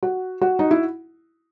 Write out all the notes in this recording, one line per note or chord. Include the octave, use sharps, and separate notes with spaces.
F#4
F#4
D#4
E4